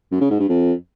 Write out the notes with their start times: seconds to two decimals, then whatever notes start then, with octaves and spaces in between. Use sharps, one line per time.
0.12 F#2
0.21 C#3
0.30 G#2
0.39 G2
0.49 F2